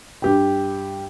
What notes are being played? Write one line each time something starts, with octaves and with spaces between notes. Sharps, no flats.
G2 G4 G5